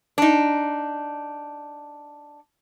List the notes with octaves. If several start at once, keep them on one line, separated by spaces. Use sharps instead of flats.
D4 D#4